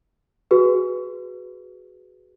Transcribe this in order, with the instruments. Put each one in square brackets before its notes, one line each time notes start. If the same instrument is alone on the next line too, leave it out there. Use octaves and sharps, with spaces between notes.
[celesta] F#4 G#4 B4